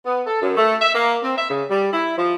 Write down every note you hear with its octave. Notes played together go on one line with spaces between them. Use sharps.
B3
A4
F#2
A3
E5
A#3
C4
E5
C#3
G3
E4
F3